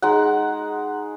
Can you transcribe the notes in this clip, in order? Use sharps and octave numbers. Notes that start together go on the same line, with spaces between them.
G#3 D#4 F#5